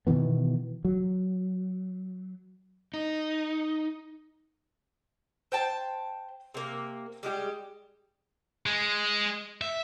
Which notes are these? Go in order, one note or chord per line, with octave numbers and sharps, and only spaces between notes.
B2 D#3 E3 B3
F#3
D#4
C5 G5 A5
C3 A#3
G3 G#3 G4
G#3
E5